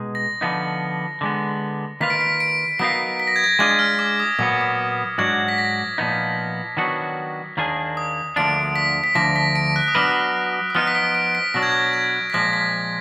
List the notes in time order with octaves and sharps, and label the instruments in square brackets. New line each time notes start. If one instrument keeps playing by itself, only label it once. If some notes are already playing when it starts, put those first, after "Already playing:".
Already playing: [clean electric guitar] B2 G#3 D#4
[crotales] A#6
[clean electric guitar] D3 F3 B3 D#4
D3 G#3 B3
[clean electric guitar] D#3 A#3 F4 B4 F5 [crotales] B6
[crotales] D7
B6
D7
[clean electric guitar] F#3 B3 D#4 A#4 F5 [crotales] B6
[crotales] B6
A#6
G#6
A#6
[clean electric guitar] G#3 D4 F4 G#4 D#5 [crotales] G#6
[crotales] F6
D6
D#6
[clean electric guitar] A#2 F#3 B3 [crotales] D6
[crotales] D6
[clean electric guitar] G#2 F#3 D4 F#4 [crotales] G#6
[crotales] B6
A#6
[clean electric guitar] A#2 F3 B3 D#4
D#3 F#3 B3 D4 F#4
D#2 D#3 A#3 D4 G#4
[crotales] D#6
[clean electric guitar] D2 D3 F3 A#3 D4 [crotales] D7
[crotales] B6
B6
[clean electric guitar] D2 D3 F3 [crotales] A#6
[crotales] B6
D7
F#6
D#6
[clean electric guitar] F#3 B3 D4 F#4 B4 [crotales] F6
[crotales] D#6
[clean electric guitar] F3 B3 D#4 [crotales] F6
[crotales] B6
D7
D7
B6
[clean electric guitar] B2 F#3 D4 [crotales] A#6
[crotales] G#6
A#6
G#6
B6
[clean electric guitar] A#2 F3 G#3 [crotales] A#6
[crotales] B6